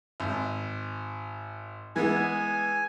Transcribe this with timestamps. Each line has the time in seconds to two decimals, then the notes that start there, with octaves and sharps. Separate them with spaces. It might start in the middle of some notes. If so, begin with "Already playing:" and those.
0.20 G#1
1.96 E3 G#3 B3 G#5